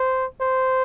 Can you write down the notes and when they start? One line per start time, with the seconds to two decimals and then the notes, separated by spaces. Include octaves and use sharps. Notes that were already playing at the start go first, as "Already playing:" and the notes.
Already playing: C5
0.41 C5